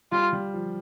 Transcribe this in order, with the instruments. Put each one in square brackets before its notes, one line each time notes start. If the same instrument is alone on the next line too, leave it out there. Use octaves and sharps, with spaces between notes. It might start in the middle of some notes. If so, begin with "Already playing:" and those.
[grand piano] G3 [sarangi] F4
[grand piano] G3
F3